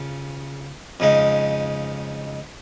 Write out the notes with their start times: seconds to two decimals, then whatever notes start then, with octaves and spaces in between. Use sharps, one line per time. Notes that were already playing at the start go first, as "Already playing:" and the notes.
Already playing: C#3 F4
1.00 F2 C#3 G#3 D#4